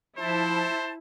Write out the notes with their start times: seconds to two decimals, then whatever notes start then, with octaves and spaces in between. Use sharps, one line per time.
0.19 F3 E4 C5 A5